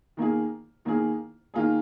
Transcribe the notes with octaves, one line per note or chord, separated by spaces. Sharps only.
D#3 A#3 F4 G#4
D#3 A#3 F4 G#4
D#3 A#3 F4 G#4